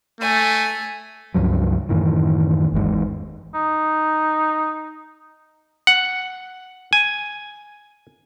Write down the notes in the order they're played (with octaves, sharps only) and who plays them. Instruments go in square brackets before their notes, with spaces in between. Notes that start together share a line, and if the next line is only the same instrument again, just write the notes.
[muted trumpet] A3 [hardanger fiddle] G#5
[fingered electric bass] C#2 G2 F3 F#3
F#2 A2 D#3 E3
G#1 E2 G#2
[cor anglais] D#4
[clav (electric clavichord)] F#5
G#5